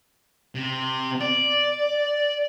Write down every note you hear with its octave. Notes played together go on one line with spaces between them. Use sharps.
C3
D5